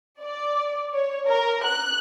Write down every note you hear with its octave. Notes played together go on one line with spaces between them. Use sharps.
D5
C#5
A#4
F#6